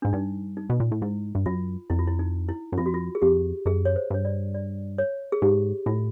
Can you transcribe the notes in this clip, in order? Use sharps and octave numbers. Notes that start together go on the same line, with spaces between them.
G#2 D4
G2 D#4
D#4
B2
A#2
A2
G#2 E4
G2
F#2 F4
F2 E4
F4
E4
D#4
E4
F#2
F2 F4
F#4
F4
G#4
F2 G4
F#2 G#4
C#5
C5
G2 C#5
D5
D5
C#5
G#4
G#2 G4
A2 F4